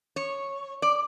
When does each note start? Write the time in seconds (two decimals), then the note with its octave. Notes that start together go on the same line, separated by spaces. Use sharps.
0.16 C#5
0.82 D5